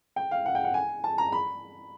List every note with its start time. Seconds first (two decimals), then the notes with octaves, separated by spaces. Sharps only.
0.16 G5
0.31 F5
0.46 F#5
0.55 G5
0.64 F#5
0.74 G#5
1.04 A5
1.18 A#5
1.32 B5